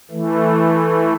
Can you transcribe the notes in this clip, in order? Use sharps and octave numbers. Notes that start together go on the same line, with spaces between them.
E3 A3